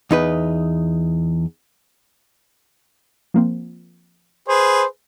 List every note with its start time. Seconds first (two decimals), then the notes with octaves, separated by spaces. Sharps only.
0.11 E2 D#4 B4
3.34 F3 A#3 C4
4.48 G#4 B4 C5